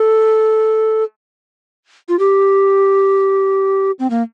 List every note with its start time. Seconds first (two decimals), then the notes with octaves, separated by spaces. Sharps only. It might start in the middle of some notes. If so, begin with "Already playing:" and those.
Already playing: A4
2.09 F4
2.19 G4
3.99 C4
4.10 A#3